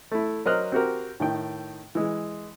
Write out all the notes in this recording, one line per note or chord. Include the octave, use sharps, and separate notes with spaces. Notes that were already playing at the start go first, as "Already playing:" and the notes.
A3 E4
F#3 A#4 C5 D#5 F6 F#6
C4 F#4 G4 A#4
A2 D#3 G5
E3 G#3